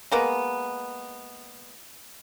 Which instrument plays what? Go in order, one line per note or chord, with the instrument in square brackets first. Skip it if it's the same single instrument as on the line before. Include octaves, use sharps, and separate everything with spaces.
[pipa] G#3 A#3 B3